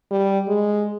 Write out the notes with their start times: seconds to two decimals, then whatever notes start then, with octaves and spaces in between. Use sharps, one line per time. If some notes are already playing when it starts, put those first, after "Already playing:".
0.11 G3
0.48 G#3